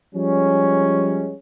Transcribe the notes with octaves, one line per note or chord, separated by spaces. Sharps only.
F3 G3 G#3 C#4